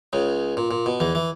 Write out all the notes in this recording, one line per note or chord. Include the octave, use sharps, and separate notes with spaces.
C#2 C#3
A#2
A#2
B2
E2 E3
E3